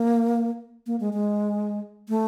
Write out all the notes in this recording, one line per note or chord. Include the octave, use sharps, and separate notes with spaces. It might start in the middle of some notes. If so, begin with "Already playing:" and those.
Already playing: A#3
A#3
G#3
G#3
A3